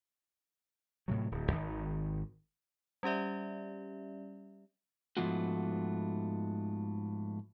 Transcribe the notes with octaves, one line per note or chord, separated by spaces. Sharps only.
A2 C3 F#3
D1
G#1 D#3
G3 C#4 G4 D5 E5
G#2 F3 A3 B3 F4 F#4